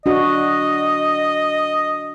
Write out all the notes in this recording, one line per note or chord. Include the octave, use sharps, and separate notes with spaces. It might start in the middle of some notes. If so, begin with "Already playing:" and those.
D4 F#4 D#5